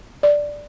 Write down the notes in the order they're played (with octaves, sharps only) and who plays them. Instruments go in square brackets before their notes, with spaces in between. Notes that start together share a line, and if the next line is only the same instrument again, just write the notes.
[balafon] D5